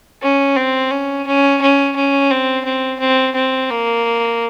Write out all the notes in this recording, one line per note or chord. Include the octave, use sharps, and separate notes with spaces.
C#4
C4
C#4
C#4
C#4
C#4
C4
C4
C4
C4
A#3